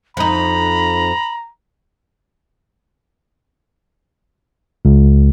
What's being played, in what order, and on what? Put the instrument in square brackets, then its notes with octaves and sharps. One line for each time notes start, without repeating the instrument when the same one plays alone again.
[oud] F2 D#4 [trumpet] A#5 [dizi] B5
[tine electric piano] C#2